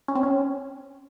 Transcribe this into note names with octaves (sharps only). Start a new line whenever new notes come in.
C#4
C4
C#4